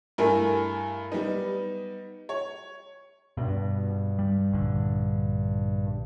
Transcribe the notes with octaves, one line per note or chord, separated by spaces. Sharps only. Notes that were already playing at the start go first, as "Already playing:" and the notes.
G2 A3 E4 A#4 G#5
G3 B3 D#4
C#5
G2 B2
G3
A#1 D3